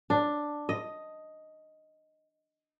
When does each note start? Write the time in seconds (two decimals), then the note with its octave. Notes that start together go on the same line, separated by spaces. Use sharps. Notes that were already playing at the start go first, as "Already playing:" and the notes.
0.10 D4
0.69 D#5